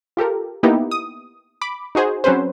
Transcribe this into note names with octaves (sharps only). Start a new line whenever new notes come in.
F4 G4 A4 A#4
A#3 B3 D#4 E4 G4
D#6
B5 D6
D#4 F#4 G#4 C5
F#3 C4 C#4 B4 C5